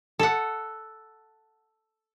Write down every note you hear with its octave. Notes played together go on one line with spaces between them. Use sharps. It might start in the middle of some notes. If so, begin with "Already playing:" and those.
A4 F#5